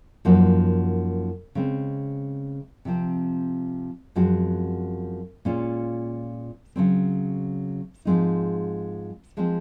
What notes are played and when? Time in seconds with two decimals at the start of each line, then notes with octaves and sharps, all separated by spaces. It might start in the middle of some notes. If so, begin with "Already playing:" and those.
0.25 F#2 F3 A#3 D#4 F#4
1.55 C#3 G#3 C4
2.85 C3 F3 C4
4.16 F#2 F3 G#3 C4 F#4
5.45 A#2 G#3 C#4 F4
6.76 C#3 F#3 C4
8.05 G#2 F3 G#3 C4 D#4
9.37 F3 G#3 C4